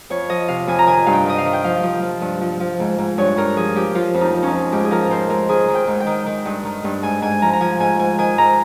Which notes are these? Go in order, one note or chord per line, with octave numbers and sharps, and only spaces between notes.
F2 C#5
F3 D#5
C3 F5
F2 G#5
A#5
D#3 G#5
G2 F5
G5
D#3 D#5
F5
D#3
G5
F3 F5
F3
F3
G2
F3
F3
G#2
G#2
G2 C#5
G2 A#4
F3 G#4
F3 G4
F3 F4
F2
D#4
F3
C#4 D#4
F2
G#2 G4
G#4
F3 A#4
G#2 C5
G#2 A#4
D#3 G#4
D#3
G5
G#2
G5
D#3
D#3
G2
D#3
G2
G#2 G#5
G#2 G#5
F3 A#5
A#5
F3 G#5
G#2 G#5
G#2 G#5
D#3 G#5
G#2 A#5